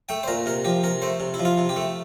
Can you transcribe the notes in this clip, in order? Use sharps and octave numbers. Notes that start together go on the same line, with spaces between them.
A3 G5
C5
A#2 A#4
C3 A#4
F3 G4
C3 A#4
A3 C5
C3
E4
F3
F4
C3
G4
A3